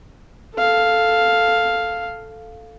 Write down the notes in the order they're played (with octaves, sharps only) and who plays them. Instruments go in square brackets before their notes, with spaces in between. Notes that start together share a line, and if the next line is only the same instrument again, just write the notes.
[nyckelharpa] A4 F5